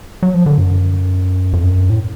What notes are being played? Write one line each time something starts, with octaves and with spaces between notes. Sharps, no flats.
F#3
F3
D3
F#2
F2
F#2
A2